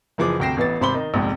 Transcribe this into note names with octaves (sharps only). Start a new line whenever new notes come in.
F#1 E3 F3 G#4 D6
D2 C3 G5 A#6 C7 E7
A1 E3 B3 A6
G#1 C3 C5 B5 C6 G7
D#3 D#4
A#1 F2 G#2 C3